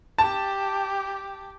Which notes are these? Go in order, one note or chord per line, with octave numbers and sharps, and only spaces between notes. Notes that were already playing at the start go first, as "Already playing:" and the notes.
G4 A5